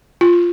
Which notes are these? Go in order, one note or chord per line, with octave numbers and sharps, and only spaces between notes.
F4